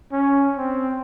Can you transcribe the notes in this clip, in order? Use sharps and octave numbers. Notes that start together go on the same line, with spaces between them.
C#4
C4